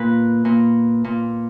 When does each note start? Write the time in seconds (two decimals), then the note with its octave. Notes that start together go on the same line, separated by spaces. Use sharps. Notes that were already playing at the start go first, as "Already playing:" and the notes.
Already playing: A#2 B4
0.45 A#2
1.04 A#2